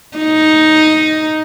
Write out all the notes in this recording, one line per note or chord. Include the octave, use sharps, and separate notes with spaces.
D#4